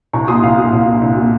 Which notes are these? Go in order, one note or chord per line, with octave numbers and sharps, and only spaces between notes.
C2 A#5 C#6
A#2 C6 D#6
C2 F5
A#2
C2 F5
A#2
C2
A#2